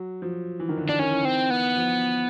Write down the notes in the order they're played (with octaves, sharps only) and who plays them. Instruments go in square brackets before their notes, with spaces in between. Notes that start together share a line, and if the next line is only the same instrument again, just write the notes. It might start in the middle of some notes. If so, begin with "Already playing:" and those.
Already playing: [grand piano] F#3
F3
E3
D#3
D3
[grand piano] D#3 [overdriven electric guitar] D4
[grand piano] D#3 [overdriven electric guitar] C#4
[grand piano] E3
[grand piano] D#3 [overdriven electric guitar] C4
[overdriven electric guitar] B3
[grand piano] F3